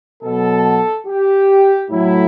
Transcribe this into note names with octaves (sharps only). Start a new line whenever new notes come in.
B2 F#3 A4
G4
A2 F#3 E4